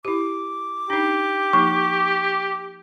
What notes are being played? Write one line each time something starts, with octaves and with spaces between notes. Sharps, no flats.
E4 G4 D6
D4 D#4 G4
F3 A#3 D#4 C#6